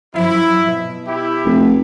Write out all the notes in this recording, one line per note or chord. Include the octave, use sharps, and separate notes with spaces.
F#2 F3 F#3 E4
B2
E4 G4
F1